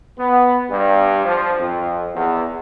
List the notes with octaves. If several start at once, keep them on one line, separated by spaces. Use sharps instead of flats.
B3
G2
F3
F2
E2